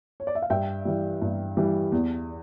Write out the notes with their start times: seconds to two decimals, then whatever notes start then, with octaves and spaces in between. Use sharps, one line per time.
0.20 C#5
0.27 D5
0.35 E5
0.42 F5
0.50 G2 E5 G5
0.85 E3 G3
1.22 G2
1.57 E3 G3
1.92 E2